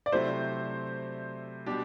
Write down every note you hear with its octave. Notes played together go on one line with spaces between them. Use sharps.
D5
C3 F#3 A3 E4 C5
B2 G3 D4 G4